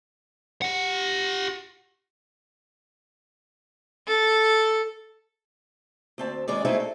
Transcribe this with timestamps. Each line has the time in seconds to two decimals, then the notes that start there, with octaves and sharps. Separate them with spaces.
0.62 G4 F#5
4.08 A4
6.18 D2 C4 A5
6.48 D#3 G#3 C#4 G#4 D5
6.65 G#3 A3 C4 D#4 E4 G#4
6.80 A4